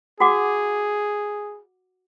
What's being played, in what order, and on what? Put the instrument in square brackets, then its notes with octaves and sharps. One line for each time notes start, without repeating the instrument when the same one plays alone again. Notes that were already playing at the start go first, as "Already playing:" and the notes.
[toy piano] F#4 F#5 D6 [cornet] G#4